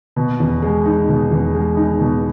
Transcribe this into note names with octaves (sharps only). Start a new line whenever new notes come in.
B2
E2
G#3
D#4
B2
E2
G#3
D#4
B2